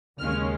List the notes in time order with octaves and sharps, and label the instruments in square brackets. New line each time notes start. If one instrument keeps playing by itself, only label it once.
[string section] D#2 C#3 G#3 C#4 F6